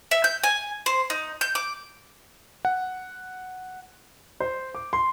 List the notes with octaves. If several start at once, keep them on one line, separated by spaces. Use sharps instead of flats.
E5
G6
G#5
C5
D#4
G6
D6
F#5
C5
D6
C6